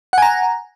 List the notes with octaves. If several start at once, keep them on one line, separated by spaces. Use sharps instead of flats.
F#5 G#5 A#5